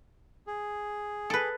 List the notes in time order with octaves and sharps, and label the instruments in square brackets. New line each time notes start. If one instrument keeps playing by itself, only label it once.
[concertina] G#4
[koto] A4 B4